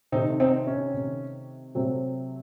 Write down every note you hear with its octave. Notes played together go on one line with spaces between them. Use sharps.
C3 D#3 A3 C4 D#4
C4 D#4
C#4
C3 D#3 A3
C3 F#3 A3 C4